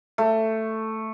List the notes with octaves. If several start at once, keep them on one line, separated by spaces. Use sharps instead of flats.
A3